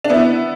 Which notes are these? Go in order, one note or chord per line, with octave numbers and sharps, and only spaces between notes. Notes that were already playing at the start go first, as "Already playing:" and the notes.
D4
B3 E4